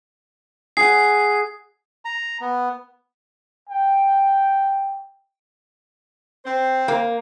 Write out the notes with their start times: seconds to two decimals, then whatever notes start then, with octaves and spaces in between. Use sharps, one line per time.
0.77 G#4 F#5 C7
2.05 A#5
2.41 B3
3.69 G5
6.46 C4 C5
6.88 A#3